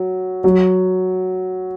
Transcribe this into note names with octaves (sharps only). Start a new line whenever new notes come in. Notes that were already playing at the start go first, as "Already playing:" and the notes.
Already playing: F#3
F#3